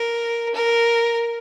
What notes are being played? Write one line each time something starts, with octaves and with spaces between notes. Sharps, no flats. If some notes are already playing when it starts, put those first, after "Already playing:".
Already playing: A#4
A#4